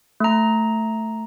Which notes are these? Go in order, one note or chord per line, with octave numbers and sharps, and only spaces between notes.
A3 A#5